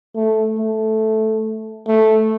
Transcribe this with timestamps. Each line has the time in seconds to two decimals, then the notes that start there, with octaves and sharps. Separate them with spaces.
0.15 A3
0.58 A3
1.87 A3